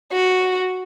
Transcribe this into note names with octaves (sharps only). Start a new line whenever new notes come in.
F#4